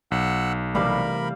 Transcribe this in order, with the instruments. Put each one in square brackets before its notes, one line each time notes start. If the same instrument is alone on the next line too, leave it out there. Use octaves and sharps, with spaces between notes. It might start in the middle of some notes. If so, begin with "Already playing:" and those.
[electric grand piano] B1 [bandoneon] F#5 E6 F#6
[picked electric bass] C3 E3 A3 [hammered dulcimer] G3 F5 [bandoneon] A#4 B5